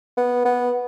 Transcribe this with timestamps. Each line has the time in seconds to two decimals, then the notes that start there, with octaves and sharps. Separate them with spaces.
0.17 B3
0.45 B3